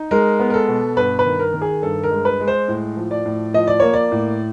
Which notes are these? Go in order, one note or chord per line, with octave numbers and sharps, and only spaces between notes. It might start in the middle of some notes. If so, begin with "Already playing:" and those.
Already playing: D#4
G#3 A#4
B3
A#4
A4
B2
G2 B4
B4
D#3
A#4
D#3
G#4
G2 A4
A#4
G#3
B4
G#3
C5
A2
F3
D5
A2
F3 D#5
D5
A#3 C#5
D5
A2